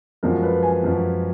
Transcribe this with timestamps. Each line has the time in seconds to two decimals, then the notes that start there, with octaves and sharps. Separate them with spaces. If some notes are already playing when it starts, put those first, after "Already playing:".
0.23 F#2 F3 G#3 A#4
0.43 B4
0.63 G#5
0.83 F#2 F3 G#3